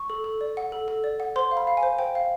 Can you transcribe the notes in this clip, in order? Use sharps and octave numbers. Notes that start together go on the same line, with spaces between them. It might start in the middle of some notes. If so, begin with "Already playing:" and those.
Already playing: C#6
A4
A4
D5
F#5
A4
A4
D5
F#5
C5 C6
F5
B5
F5
G#5
C5
C5 G5
F5